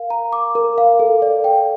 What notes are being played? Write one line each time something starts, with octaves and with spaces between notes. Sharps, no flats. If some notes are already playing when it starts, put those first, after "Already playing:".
Already playing: A#4 F5
A#5
D6
A#4
F5
A4
D5
G5